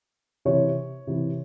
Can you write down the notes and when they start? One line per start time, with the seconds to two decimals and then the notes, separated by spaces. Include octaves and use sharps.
0.45 C3 E3 C#5
1.07 C3 E3